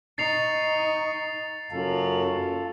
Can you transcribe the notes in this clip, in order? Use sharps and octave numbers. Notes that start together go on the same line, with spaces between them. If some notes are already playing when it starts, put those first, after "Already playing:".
D#4 C#6 A6 C7 F7
F#1 F#2 F4 A4